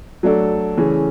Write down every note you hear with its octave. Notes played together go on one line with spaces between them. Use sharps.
F#3 A3 D4 A4 D5
C#3 E3 A3 C#4 G#4